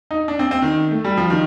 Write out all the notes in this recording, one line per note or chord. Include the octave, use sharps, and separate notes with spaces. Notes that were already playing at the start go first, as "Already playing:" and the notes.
D#4
D4
C4
C4
D#3
A3
G3
F3
D#3